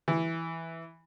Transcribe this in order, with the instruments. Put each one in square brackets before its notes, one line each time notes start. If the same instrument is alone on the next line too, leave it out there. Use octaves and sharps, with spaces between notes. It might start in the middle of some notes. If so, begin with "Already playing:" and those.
[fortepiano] E3